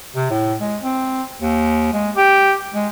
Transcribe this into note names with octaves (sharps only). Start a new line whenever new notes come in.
C3
A2
G#3
C4
D#2
G#3
G4
G#3